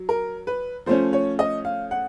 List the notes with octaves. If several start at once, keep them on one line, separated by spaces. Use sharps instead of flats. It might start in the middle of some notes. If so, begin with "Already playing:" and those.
Already playing: F#3
A#4
B4
F3 A3 C#4 C5
C#5
D#5
F5
F#5